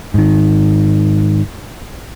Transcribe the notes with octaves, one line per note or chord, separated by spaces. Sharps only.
G#2 D#3